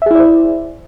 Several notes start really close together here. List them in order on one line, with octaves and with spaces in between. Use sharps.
E5 G#4 E4 D5 C5